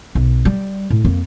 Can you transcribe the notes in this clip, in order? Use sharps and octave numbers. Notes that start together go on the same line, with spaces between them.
B1
G3
A2
F2 A#3